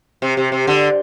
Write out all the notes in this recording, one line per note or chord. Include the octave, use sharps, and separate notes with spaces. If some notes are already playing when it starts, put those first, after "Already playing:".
C3
C3
C3
D3